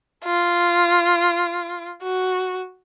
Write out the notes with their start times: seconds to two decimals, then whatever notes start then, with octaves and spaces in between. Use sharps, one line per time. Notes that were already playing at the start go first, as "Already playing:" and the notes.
0.25 F4
2.03 F#4